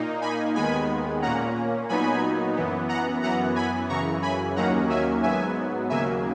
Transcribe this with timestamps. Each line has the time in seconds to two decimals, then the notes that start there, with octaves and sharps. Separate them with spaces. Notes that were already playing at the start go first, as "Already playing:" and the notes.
Already playing: A#2 A#3 D#4
0.21 G#5 B5
0.55 D#2 D#3 G#3 B3 G#5 B5
1.22 A#2 A#3 C#4 F#5 A#5
1.89 A#2 F#3 B3 D#4 G#5 B5
2.56 F#2 E3 B3
2.89 F#5 A#5
3.22 F#2 E3 B3 F#5 A#5
3.56 G#5 B5
3.89 F#2 C#3 E3 A#5 C#6
4.22 G#5 B5
4.56 D#2 D#3 F#3 A#3 C#4 F#5 A#5
4.89 E5 G#5
5.23 G#2 F#3 B3 E5 G#5
5.89 D#2 C#3 F#3 A#3 E5 G#5